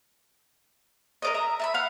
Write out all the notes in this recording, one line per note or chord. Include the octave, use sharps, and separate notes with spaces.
A#4 D5 D#5
E5 A#5
E5 A5 B5
F5 F#5